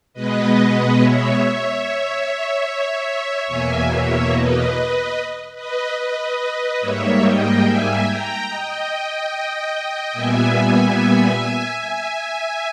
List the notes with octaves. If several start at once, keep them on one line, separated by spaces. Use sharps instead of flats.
B2 G#3 B3 B4 D#5
C#5 E5
E2 B2 A#3 E5 G#5
C#5 E5
B4 D#5
B4 D#5
B4 D#5
G#2 G3 A#3 C#5 E5
D#5 G5
E5 G#5
G5 A#5
D#5 G5
A#2 G3 B3 E5 G#5
E5 G#5